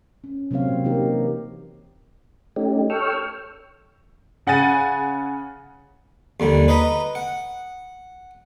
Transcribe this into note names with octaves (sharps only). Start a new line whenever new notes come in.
C#4
C3 F#3 A#3 C4 C#5 F5
E3 A#3 D#4 G4 A#4
A3 C#4 D#4 G4
A4 C#5 G5 C#6 E6 F6
C#3 F#5 G#5 A6 D#7
D#2 D3 G3
B4 D#5 A#5 B5
F#5